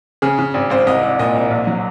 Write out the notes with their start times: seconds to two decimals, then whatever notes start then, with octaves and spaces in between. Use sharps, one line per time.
0.22 C#3 G#4
0.39 C#3
0.54 G#1
0.70 G#1 C5
0.87 C2 D#5
1.03 C2
1.19 A#2 D#5
1.35 C2
1.51 A#1
1.67 F#3